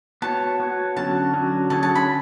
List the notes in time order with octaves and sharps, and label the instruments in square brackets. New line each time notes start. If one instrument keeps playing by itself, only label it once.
[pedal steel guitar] B3 F#4 C#5 [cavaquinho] A5
[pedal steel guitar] B3 F#4 C#5
[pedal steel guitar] D3 F#3 C#4 F#4 [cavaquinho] A5
[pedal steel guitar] D3 F#3 C#4 F#4
[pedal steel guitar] D3 F#3 C#4 G#4 C#5 [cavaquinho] A5
[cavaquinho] A5
B5